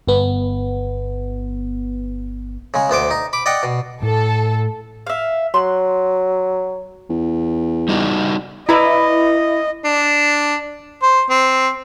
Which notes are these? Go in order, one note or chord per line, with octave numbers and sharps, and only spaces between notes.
G1 B3
C#3 G#3
D2 B3 C5 D6
D#4
B5 D6
D5 D#5 F#5 G5
B2
A2 A4
E5 F5
F#3 C6 F#6
E2
G3 D#4 F#4
E4 B4 D5 D#5 A#5
D4
C5
C4